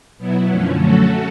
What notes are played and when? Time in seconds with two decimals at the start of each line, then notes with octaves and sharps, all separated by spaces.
0.18 B2 F#3 B3 E4
0.50 F#2 D3 F3 A3 C#4
0.81 F#3 A3 C#4 F#4 A4